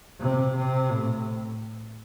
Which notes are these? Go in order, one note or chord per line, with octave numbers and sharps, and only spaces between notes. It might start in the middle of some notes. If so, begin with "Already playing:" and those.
C3
C3
A2